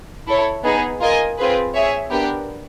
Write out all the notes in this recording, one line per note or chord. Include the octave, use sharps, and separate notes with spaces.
E4 A4 C#5
B3 D#4 G#4
F4 A#4 D#5 G#5
C4 F4 G#4 B4
G#4 C#5 E5
B3 D4 G4 A#4